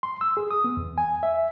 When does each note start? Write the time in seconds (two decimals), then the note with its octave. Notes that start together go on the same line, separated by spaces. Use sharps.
0.03 C6
0.21 E6
0.37 G#4
0.51 D#6
0.64 B3
0.77 E2
0.98 G#5
1.23 E5